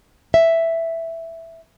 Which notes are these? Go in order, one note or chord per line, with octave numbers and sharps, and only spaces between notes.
E5